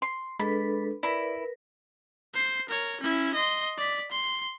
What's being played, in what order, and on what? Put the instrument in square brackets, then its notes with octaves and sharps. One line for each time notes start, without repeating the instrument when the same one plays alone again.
[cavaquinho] C6
[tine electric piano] G#3 [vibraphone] D4 A4 B4 [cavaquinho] B5
[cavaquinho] E4 B5 [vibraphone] A#4 B4 [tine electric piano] D5
[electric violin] C5 C7
A#4 C#5
C#4 E4
D#5 C6
D5 B6
C6